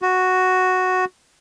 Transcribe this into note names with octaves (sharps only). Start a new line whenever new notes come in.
F#4